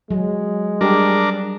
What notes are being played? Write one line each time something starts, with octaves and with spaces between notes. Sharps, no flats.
F#3 G#3
G3 D4 G4 G#4 A#4